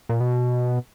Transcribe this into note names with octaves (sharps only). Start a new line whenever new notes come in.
A#2
B2